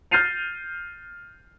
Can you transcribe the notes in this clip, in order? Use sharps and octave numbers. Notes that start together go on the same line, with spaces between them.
F6 G6 A6 C7 D#7 F7